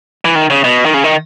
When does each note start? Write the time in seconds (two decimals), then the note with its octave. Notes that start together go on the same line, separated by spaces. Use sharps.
0.25 E3
0.35 D#3
0.50 C#3
0.64 B2
0.86 D#3
0.94 C#3
1.04 D#3